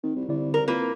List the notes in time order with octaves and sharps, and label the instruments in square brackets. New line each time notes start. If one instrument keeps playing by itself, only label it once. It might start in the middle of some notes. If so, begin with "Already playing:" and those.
[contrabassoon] D#3 [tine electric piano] C4
[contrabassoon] C2
[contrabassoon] C2 [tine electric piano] D3 E4 D5
[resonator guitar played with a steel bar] A#4
[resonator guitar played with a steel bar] A#3 B4 [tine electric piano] C4 E4 F4